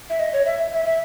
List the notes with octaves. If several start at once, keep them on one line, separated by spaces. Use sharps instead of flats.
E5
D#5
C#5
E5
E5
E5